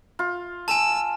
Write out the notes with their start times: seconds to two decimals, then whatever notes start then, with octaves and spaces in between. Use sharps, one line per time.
0.19 F4
0.68 G#5 A5 E6